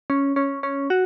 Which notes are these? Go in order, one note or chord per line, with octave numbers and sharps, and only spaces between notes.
C#4
C#4
C#4
F#4